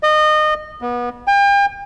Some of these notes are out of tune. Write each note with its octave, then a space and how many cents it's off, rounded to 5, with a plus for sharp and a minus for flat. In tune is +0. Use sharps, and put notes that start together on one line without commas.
D#5 -25
B3 -30
G5 +40